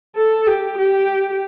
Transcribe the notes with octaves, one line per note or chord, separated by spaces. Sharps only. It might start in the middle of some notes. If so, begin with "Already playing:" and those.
A4
G4
G4